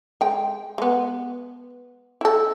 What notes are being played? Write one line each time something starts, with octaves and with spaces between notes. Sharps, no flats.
G#3 G5
G#3 B3
E4 A4